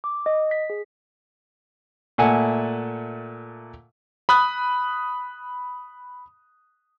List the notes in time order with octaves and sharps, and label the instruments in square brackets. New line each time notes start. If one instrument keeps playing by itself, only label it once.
[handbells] D6
D#5
B6
G#4
[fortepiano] A#2 A3 E5 F#5 G#5 A5
[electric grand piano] B5 D#6 F#6